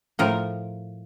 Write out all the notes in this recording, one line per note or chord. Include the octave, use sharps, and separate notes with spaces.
A2 F3 A#4